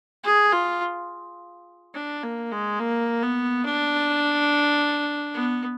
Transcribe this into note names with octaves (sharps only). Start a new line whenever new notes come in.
G#4
F4
D4
A#3
G#3
A#3
B3
D4
B3